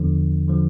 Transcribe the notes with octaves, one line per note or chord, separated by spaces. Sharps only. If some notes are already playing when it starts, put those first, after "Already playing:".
Already playing: E2 D3 F3
D3 F3